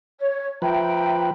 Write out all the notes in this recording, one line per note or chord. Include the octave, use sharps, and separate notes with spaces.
C#5
F3 B4 E5 G5 A#5